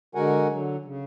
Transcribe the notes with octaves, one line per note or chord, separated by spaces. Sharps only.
D3 G#3 F#4 A#4 F#5 G#5
D3 F#3
C#3